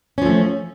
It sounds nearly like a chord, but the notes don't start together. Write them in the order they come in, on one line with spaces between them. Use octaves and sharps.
C#4 F3 A3